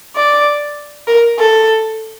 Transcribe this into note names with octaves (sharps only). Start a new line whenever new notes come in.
D5
A#4
A4